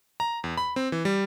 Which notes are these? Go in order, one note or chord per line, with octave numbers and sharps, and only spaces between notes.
A#5
E2
B5
C4
E3
G3